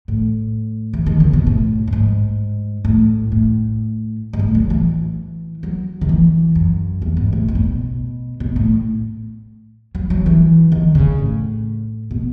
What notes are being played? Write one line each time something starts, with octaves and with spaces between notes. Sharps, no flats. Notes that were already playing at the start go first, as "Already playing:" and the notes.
A2
E3
D#3
C#3
B2
A2
A2
G#2
A2
A2
G#2
A2
F#3
E3
F#3
D#3
E3
F#2
E2
G#2
A2
B2
A2
B2
B2
A2
F#3
F#3
E3
D#3
C#3
A2
B2